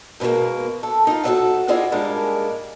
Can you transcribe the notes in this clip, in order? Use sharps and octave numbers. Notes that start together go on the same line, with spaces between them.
G#2 B2 D3 G#3 A#3
A4
D#4 F4
F#4 A4 A#4 D5 E5 F#5
E4 F4 G#4 D5 D#5
G#2 G3 G#3 A#3 D4